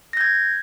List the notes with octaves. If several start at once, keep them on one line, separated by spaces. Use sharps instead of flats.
G6 G#6 A#6